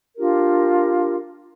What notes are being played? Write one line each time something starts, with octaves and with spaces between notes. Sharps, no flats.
D4 F4 G4 A#4